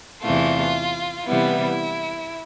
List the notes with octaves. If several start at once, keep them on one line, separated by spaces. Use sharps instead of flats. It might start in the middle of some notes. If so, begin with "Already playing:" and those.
E2 C3 E3 A3 F4
C3 E3 G3 B3 E4